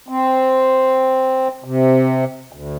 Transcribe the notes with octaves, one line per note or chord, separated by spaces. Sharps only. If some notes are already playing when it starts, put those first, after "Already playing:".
C4
C3
D2